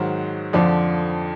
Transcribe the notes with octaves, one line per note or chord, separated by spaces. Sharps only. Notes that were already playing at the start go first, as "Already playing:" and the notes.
Already playing: G#2 D#3 F#3 C5
F2 D3 F3 D5